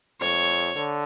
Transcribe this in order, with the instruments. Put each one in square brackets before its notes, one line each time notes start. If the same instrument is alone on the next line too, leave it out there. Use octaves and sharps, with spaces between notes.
[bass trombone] F2 [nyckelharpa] C#5
[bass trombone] D3